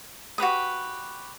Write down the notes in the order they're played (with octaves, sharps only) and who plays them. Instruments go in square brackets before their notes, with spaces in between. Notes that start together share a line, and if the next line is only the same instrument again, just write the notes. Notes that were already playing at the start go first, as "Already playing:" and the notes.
[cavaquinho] F#4 G4 B4 D#6